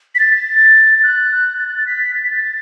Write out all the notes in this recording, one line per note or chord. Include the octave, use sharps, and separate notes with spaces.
B6
A6
F#6
A6
F#6
A6
B6
A6
B6
A6